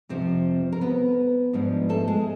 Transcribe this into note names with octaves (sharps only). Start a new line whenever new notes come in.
F2 C3 F3 C4 C5
A#4
B3 B4
G#2 F3 G#3 B3 D4
A3 A4
G#3 G#4